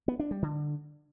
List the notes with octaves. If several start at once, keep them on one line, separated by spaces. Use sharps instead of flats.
B3
D4
G3
D3